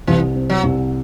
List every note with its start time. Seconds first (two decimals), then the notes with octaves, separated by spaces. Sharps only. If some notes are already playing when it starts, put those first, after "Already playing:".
0.07 C2 E3
0.35 C4
0.50 F#3
0.63 C2